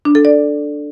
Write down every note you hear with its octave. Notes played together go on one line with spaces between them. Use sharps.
D4
A4
D5